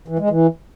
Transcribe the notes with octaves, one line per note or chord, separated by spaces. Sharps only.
E3
G#3
E3